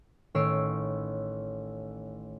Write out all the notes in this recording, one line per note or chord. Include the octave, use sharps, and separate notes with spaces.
A1 D#3 C#5 E6 C7 D7